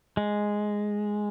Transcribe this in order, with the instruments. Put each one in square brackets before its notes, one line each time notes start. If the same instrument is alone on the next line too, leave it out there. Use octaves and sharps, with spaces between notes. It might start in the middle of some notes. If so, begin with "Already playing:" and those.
[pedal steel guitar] G#3